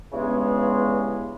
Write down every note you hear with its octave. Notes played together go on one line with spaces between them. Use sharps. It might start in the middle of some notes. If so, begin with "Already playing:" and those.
G2 C#3 E3 G#3 B3